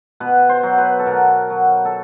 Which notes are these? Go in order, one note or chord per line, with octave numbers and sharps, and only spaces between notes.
B2 B4
C5
F#3
B4
A4
B2 A#4
F#3
A4